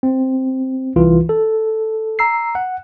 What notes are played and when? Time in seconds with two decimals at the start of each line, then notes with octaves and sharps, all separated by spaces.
0.03 C4
0.96 C2 E3 F4
1.29 A4
2.19 A#5 E6 C7
2.55 F#5